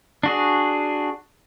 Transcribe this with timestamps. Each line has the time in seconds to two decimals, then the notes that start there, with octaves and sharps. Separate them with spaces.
0.23 D4 F#4 G#4